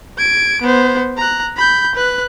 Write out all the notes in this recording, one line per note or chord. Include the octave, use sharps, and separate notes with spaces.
G#6 D7
B3 C5
A#5 F#6
B5 G6
B4 F#6